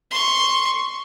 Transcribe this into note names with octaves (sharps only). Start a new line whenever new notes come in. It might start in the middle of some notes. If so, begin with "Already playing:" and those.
C6 C#6